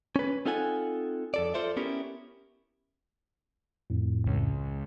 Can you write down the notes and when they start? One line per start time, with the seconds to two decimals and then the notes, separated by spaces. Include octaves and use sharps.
0.16 C#4 B4
0.45 C4 D#4 F4 A4 F#5 G#5
1.34 F2 A4 D5
1.54 F4 A4 C5 D5 E5
1.77 B3 C#4 E4 G4 A#4
3.90 F2 A2
4.26 C#2